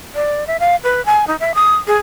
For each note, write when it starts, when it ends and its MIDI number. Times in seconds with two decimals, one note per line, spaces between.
0.15 0.47 74
0.47 0.57 76
0.60 0.76 77
0.84 1.04 71
1.06 1.27 80
1.27 1.36 63
1.40 1.52 76
1.55 1.75 87
1.87 1.96 68